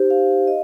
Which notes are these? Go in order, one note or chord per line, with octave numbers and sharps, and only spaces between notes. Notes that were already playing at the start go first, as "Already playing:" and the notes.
Already playing: D#4 G4 C5
F5
D#5